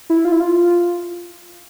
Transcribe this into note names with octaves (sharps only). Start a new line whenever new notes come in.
E4
F4
E4
F4